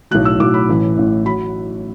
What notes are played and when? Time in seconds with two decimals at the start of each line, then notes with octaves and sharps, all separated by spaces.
0.11 B1 A2 F#3 F#6
0.25 E6
0.40 B1 A2 F#3 D6
0.54 B5
0.69 A1 A2 E3
0.97 A1 A2 E3
1.25 F#3 B5